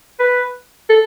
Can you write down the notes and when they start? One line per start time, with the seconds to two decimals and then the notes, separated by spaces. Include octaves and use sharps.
0.19 B4
0.89 A4